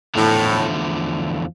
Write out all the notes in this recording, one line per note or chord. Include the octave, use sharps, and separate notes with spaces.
E2 A2 D3 F3 A3